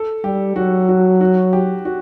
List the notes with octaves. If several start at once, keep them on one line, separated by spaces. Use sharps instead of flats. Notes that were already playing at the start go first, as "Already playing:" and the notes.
Already playing: A4
G3 G4
F#3 F#4
F#4
F#4
G4
F#4